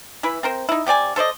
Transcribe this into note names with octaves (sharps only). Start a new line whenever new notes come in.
E3 E4 B4 B5
C4 A#4 C5
D#4 E4
C3 G4 D5 G#5
A4 C5 D5 D#5